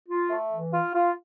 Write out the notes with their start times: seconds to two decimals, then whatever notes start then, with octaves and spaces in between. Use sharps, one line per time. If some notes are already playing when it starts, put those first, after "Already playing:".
0.08 F4
0.30 A3
0.51 E3
0.73 F4
0.93 F4